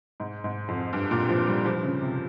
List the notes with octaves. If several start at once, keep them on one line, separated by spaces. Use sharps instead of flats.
G#2
G#2
F2
G2
A#2
F3
G3
F3
C#3
C3